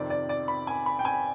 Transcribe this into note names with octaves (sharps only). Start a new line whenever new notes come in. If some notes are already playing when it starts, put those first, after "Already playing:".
Already playing: F2 C3 D#3 D5
D5
D5
B5
G#5
B5
G5
G#5